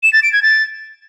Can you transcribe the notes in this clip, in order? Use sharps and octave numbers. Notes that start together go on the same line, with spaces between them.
E7
A6
D7
G#6
A6